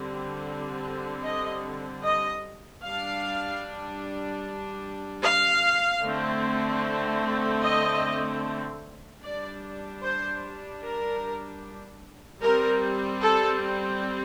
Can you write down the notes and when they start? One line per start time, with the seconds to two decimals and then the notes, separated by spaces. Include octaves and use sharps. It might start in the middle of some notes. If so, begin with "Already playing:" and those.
Already playing: D3 G3 C4
1.24 D#5
2.04 D#5
2.83 G3 D4 F5
5.23 F5
6.03 D3 A3 C4
7.63 D#5
9.22 G3 D4 D5
10.03 C5
10.82 A#4
12.42 G3 C4 A#4
13.22 A4